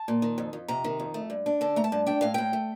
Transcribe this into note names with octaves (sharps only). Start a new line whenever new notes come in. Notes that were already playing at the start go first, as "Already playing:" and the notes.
Already playing: A5
A#2
D#3
F2
F2
C3 A#5
D#3
F2
A3
G2
D4
D3 A5
A3 A#5
A5
G2
D4 G5
A2 F5
A2 G5
A3